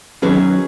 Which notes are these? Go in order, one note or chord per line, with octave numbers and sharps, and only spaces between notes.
D#3 F#3 C#4 G#4 B4